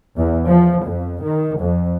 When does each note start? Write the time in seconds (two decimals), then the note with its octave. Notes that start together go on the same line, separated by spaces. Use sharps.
0.17 E2
0.48 F3
0.85 F2
1.23 D#3
1.59 F2